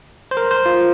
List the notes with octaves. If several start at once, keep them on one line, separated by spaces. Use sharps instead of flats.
C5
A#4
C5
F4